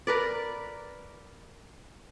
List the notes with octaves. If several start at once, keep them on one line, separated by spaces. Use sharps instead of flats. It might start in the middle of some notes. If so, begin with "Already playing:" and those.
A#4 B4 D5